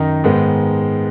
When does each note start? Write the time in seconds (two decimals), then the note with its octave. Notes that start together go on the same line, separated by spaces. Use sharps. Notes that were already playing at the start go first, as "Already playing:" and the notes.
Already playing: F#2 D#3 D#4
0.24 G#2 D#3 G#3 B3